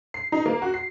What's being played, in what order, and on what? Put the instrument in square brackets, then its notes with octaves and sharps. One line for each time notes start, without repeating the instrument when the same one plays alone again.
[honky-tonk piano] C7
D#4
A#3
F#4
C7